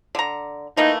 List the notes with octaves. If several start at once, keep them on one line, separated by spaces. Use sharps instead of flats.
D3 A#5
E3 A3 A#3 D#4